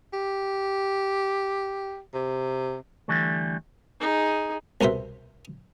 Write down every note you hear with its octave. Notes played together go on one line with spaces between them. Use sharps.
G4
C3
D3 E3 G3 A3
D#4 G#4
C2 B2 A#4 C5 E5